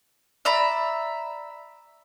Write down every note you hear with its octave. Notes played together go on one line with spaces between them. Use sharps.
D5 E5 A#5 B5